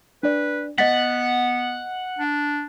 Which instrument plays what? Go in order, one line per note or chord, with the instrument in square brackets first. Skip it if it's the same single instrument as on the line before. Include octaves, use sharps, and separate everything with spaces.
[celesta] D4 D5 [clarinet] B4
[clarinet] B3 [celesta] D#5 A6 B6 [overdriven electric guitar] F#5
[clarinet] D4